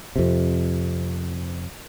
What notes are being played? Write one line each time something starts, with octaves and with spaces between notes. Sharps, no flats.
F2 C3